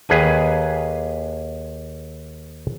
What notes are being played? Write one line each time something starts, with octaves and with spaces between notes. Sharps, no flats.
D#2 G#4 B4 G#5